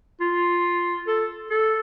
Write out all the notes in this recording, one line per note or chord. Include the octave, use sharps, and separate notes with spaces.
F4
A4
A4